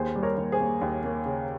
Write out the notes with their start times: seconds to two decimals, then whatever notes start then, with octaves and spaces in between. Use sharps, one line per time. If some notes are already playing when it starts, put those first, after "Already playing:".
Already playing: D#2 G#4 C5
0.16 G3
0.23 A#4 C#5
0.37 D#2
0.52 G#4 C5
0.60 A#3
0.81 D#2
1.04 A#3
1.26 C#3